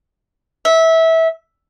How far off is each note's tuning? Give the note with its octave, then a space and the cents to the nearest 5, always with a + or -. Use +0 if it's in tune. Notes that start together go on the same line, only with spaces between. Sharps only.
E5 -20